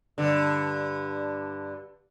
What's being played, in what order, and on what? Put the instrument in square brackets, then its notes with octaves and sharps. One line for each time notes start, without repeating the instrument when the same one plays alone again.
[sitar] G2 D3